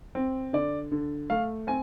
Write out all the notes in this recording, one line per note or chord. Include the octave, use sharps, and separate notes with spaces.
C4
D3 D5
D3
A3 F5
C4 G#5